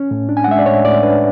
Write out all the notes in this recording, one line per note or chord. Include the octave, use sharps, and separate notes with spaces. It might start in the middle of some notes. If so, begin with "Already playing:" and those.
Already playing: C#4
A2
D4
G#5
F#5
G#3 E5
D5
A2 C#5
A2 D5
D4 B4